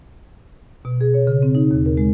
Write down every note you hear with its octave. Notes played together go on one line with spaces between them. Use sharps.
B2
G#4
C#5
C#3
C4
D#4
D#2
A#4
G#3